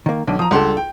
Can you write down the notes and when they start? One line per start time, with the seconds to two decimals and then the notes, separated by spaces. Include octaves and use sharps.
0.06 D#3 A#3
0.27 B1 D3
0.39 F3 A#5 D#6
0.51 C#2 G3 D4 A4 F#5 C6
0.77 G5